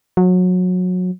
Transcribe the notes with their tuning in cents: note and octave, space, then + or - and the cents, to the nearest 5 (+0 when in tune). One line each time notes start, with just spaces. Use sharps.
F#3 -25